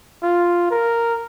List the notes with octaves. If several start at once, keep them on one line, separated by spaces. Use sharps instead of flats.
F4
A#4